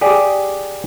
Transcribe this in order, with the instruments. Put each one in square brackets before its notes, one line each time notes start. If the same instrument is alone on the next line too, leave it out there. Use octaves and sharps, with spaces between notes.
[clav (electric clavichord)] G4 G#4 D5